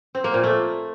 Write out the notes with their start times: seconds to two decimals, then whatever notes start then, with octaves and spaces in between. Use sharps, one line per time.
0.15 C4
0.24 A#3
0.34 A#2
0.43 A3